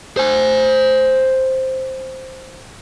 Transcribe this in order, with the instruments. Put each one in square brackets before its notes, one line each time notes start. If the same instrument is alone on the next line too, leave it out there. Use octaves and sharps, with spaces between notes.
[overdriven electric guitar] C5 G#5